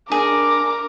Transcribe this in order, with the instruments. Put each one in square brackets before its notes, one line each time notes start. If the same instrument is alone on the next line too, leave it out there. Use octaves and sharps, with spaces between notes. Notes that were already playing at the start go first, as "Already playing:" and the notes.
[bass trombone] D4 [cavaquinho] G#4 [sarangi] A#4 [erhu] D6